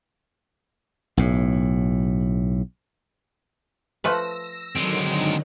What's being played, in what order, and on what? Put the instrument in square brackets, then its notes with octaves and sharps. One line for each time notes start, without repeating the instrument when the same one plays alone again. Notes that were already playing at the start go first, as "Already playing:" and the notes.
[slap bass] B1 A2
[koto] F3 A3 B4 [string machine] E6 A#6
[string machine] D3 D#3 F#3 [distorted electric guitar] G#3 C4